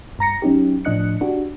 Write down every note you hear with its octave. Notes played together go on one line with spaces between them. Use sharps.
G2 A#5 A#6 C#7
F#3 C#4 D#4 G4
A2 F3 D4 D#5 F#6 C#7
D4 F#4 G4